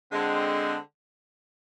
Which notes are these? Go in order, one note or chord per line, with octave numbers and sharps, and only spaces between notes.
D3 G#3 C4